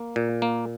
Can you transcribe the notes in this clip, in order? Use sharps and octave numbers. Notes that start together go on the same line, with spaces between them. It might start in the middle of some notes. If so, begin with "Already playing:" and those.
Already playing: A#3
A#2
A#3